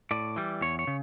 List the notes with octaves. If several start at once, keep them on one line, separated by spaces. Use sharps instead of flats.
A2 D5
E3 G3
E2 C#5
C#5
C#3